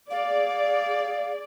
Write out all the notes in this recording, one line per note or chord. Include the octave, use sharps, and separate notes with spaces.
G#4 D5 F5